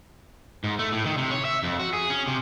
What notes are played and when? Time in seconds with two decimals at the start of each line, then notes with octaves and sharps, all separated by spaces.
0.64 G#2
0.79 A3
0.92 A2
1.06 D#3
1.18 C3
1.31 C#5
1.45 E5
1.64 F2
1.79 F#4
1.93 G#4
2.10 C#4
2.28 C3